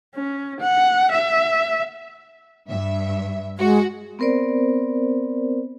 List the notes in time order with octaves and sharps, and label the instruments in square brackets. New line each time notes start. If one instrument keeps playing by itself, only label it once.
[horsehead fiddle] C#4
F#5
E5
[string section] G2 E5
[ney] G#3 [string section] F#4
[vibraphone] B3 C4 A#4 C5 D5